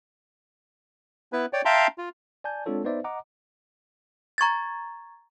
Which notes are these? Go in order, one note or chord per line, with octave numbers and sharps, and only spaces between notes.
B3 E4 B4
C#5 D5 G5
E5 F5 G5 A5 A#5 C6
F4
D5 G#5 A5 G6
G#3 C4 D4 F4 A4 C#5
B3 D#4 B4 C5 D5 E5
D#5 F#5 A#5 D6
A#5 C#6 G#6 A6